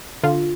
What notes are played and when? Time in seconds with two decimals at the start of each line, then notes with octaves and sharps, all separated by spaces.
0.24 D3 F4